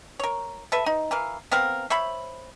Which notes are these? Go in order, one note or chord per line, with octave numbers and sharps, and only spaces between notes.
A#4 C#5
A4 B4 E5
D#4
E3 A#4 F5
B3 C4 A#4 F5
C5 C#5 E5 B5